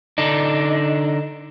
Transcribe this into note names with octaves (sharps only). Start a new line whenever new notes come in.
D3 D4 D#4